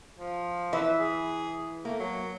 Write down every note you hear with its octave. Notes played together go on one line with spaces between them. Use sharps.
F3
E3 B4 E5
G#4
A3 A#3
F#3